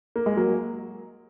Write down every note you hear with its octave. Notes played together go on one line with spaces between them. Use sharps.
A#3
G#3
F#3 A#3